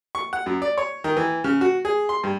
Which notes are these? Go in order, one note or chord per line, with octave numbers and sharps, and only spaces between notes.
C#6
F#5
F#2
D5
C#5
D#3
E3
C#3
F#4
G#4
C6
G2